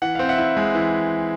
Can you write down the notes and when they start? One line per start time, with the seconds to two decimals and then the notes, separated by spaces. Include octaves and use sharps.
0.02 E3 F#5
0.15 C4 F5
0.29 E5 F#5
0.38 E4
0.57 G#3
0.75 E3